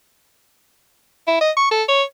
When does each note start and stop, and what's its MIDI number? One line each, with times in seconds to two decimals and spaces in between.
1.28 1.41 64
1.41 1.51 75
1.57 1.67 85
1.71 1.83 69
1.89 2.03 73